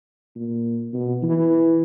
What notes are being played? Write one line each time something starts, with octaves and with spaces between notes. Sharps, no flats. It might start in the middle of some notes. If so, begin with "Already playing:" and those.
A#2
B2
E3